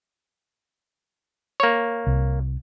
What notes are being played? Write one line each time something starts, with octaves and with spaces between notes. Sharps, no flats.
A#3 C#5
C2